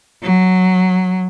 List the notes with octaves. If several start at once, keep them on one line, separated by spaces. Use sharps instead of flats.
F#3